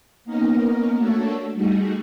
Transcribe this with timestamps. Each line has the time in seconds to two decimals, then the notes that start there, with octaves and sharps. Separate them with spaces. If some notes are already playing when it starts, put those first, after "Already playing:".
0.25 A#3 B3 C#4 D#4 A#4
0.95 A3 A#3 D4 F#4 A4 C#5
1.54 G3 A3 D#4 F#4 G#4